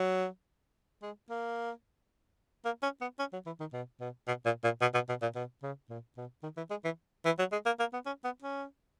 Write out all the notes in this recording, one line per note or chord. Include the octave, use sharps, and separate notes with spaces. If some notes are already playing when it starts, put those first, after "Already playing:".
Already playing: F#3
G#3
A#3
A#3
C#4
B3
C#4
F#3
E3
D#3
B2
B2
B2
A#2
A#2
B2
B2
B2
A#2
B2
C#3
A#2
B2
D#3
E3
G#3
E3
E3
F#3
G#3
A#3
A#3
B3
C#4
B3
C#4